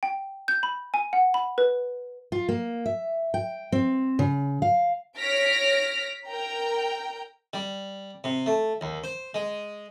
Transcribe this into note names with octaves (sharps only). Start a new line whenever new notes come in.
G5
G6
B5
G#5
F#5
B5
B4
F4
A#3
E5
G5
C4
C#3
F5
C#5 F6 A#6 B6 D7
A#4 G5 A#5
G3
C3
A3
D#2
C5
G#3